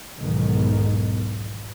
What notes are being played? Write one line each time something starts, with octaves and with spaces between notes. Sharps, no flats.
B1 E2 G#2 D#3